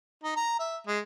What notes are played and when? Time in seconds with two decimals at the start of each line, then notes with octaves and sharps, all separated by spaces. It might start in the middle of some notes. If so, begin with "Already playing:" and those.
0.24 D#4
0.36 A#5
0.59 E5
0.87 G#3